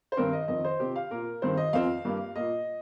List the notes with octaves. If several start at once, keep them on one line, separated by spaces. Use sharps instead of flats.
C5
G2 D#3 C4 A#4
D#5
F2 D#3 C4 D#5
C5
C3 F3 C4 G4
F5
A#2 A#3 A#4
G2 D#3 C4 C5
D#5
F2 F3 C4 F5
G2 G3 A#3
A#2 A#3 D#5